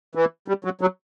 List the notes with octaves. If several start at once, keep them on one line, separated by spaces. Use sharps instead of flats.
E3
G3
F#3
F#3